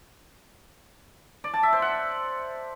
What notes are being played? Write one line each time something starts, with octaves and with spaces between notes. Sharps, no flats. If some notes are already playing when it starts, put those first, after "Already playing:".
D5
A5
E5
C5
F#5